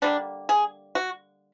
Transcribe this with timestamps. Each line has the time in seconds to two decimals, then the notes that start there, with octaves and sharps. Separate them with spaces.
0.02 D3 G3 A#3 D4
0.49 G#4
0.95 F#4